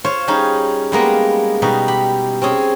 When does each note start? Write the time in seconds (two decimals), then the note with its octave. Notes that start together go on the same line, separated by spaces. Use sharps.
0.04 F4 C5 C#5
0.28 G3 C#4 D#4 G#4
0.92 G3 G#3 A#3 B3
1.62 B2 G3 D#4
1.88 G4 B5
2.42 C4 C#4 G#4